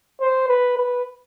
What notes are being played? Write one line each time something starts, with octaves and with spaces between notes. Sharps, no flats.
C5
B4
B4